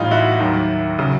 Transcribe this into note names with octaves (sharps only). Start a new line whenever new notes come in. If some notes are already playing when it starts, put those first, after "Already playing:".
Already playing: A2 E3 G3 D#4 F4
E4 F#4
D#2 D#3 F#3
C#3 F#3